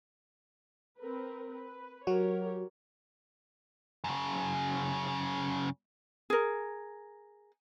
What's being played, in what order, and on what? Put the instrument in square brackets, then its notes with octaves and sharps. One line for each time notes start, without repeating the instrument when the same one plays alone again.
[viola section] C4 A#4 B4
B4
[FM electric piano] F#3 F#4 [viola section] G4 A#4 C#5
[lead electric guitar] F#2 C#3
[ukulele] G#4 A#4